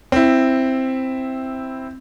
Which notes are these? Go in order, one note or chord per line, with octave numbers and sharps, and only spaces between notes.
C4 E4